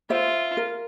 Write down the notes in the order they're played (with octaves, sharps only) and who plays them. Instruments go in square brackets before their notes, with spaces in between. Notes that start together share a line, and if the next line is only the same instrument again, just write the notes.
[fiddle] F4 [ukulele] C5 E5
[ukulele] A#4